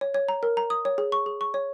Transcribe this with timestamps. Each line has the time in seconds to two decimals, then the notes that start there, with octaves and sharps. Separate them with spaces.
0.01 C#5
0.14 C#5
0.29 A#5
0.43 A#4
0.57 A#5
0.70 D#6
0.85 C#5
0.98 G#4
1.12 C#6
1.26 G#4
1.41 C#6
1.54 C#5